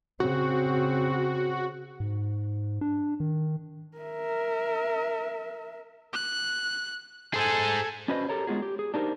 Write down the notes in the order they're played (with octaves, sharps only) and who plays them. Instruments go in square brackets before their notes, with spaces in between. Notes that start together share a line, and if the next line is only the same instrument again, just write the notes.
[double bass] C#3 C4 [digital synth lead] F#4
[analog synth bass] G#2
D4
D#3
[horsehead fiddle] A#4 E5
[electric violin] F#6
[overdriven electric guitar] G#4 C5 [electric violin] A4 G#5
[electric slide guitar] C#4 D4 F#4 B4 C5 D#5
G4 A4 A#4 C#5
G#3 B3 F4 F#4 G#4
G4
G#4
D4 D#4 G4 A#4 C5